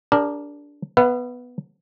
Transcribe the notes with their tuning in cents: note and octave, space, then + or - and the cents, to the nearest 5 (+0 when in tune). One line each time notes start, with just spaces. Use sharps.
D4 -15 G4 +40 A#4 +0
B3 +0 B4 +0 E5 +45